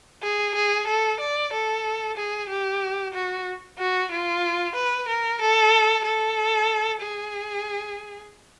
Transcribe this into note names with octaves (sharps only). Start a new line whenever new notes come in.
G#4
G#4
A4
D5
A4
G#4
G4
F#4
F#4
F4
B4
A#4
A4
A4
G#4